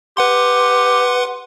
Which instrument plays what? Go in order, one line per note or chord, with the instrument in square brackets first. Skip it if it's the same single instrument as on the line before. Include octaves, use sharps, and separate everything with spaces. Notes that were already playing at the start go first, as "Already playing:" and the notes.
[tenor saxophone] G4 [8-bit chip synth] B4 F#5 C6